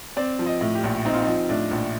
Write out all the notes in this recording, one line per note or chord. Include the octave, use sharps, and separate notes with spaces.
C4 D5
F3
D#5
A2
G4
A#1
C4 D#4
F4
D#4
F3
A2 D4
A#1